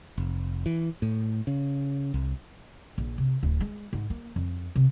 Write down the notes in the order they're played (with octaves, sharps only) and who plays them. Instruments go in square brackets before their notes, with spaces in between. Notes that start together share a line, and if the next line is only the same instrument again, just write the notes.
[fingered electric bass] F1
E3
A2
C#3
C2
[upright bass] A#1
C3
D1
G#3
G#2
A#3
F2
C3